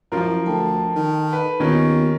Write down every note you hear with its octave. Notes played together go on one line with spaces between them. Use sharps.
F#2 F3 E4 F4 A#4
D2 A4 G5 A5
D#3
B4
D#2 D#3 B3 C#4 F4